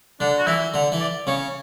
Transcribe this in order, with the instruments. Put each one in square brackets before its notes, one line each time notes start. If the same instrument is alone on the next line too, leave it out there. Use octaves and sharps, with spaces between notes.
[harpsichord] D3 [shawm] D4
[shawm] F#4
[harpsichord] E3 [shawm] E4
[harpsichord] D3
E3
[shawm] D5
[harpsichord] C#3 [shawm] C#5